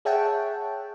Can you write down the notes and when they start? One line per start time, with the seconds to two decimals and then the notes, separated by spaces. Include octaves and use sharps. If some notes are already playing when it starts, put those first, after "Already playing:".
0.05 G#4 C#5 E5 F#5 G5 A5